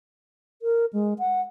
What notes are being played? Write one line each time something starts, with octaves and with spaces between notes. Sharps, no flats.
A#4
G#3
F#5